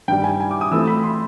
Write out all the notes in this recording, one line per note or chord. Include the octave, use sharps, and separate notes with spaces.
G2 D#3 G3 G5
G#5
G#5
D6
D#6
E3 A3 C4 F4 E6
B5
C6